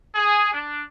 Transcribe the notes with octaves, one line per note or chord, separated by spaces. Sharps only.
G#4
D4